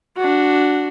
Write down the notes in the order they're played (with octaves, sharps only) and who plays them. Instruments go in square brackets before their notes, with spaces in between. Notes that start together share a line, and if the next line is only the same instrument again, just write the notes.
[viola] D4 F#4